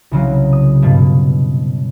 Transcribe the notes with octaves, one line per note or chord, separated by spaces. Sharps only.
C2 C#3 F#3
D#6
G2 B2